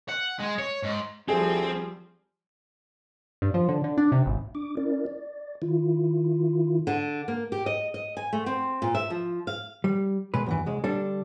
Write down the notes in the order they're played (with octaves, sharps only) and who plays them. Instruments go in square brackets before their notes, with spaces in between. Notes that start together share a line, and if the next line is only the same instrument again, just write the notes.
[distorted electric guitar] F#5
G#3
C#5
G#2
[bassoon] D2 [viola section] F3 G3 [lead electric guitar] C4 [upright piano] G#4
[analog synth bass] G2
F3
D3
D3
D4
C3
G#1
[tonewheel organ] D4 D6
C#4 E4 A#4 D5
D5
D#3 E4 F4
[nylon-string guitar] D3
A#3
G4
D#5
D#5
G#5
A3
C4
A#2
E5
F3
F5
[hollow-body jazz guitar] G3
B1 B2 G#3 B4
E2 G2 E3
C2 G#3
D3 G3 D4 A4